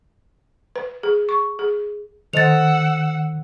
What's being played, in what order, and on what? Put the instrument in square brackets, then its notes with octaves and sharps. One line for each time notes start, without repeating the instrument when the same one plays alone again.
[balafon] B4
G#4
C#6
G#4
[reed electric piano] D#3 [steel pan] A4 C5 D#5 [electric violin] F#5 E6 [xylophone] A6 F7